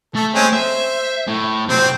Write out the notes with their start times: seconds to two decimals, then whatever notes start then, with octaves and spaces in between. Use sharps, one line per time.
0.15 A3 A4 E5
0.34 G#3 C4 C#4
0.53 C5 E5
1.27 A2
1.69 C3 F#3 C4